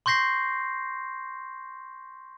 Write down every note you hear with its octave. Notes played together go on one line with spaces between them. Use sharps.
C6 C#6 G6 A#6 C7